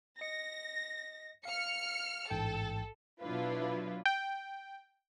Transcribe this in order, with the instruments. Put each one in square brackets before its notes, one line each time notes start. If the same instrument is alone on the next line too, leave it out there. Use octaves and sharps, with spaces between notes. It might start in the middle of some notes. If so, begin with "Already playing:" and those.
[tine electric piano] D#5 C#7 [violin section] A#6
[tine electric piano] F5 [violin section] F6 C#7
[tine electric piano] A1 G#2 G5 [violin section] A4
[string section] B2 F#3 D4 E4 F4 B4
[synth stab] G5